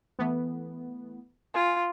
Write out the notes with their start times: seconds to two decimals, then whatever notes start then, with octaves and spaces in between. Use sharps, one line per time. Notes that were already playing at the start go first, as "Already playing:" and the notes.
0.19 E3 A3 B3
1.54 F4 G#5